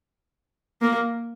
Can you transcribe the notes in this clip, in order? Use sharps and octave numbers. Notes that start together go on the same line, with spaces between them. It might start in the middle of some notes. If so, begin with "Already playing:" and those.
A#3